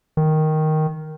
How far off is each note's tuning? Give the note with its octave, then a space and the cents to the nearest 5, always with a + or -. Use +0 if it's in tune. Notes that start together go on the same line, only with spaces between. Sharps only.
D#3 +0